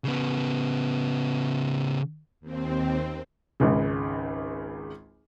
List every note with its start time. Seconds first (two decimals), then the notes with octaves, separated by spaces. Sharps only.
0.04 C#3 B3
2.41 D#2 C4
3.60 G#1 C#2 C#3